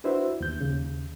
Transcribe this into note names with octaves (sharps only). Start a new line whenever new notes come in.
D4 E4 F#4 B4 C5 E5
D#2 G6
D#2 C#3